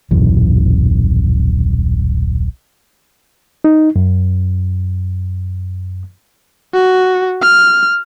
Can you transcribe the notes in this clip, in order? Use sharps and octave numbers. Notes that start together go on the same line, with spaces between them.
D#1 B1 F#2 E3
D#4
F#2
F#4
F6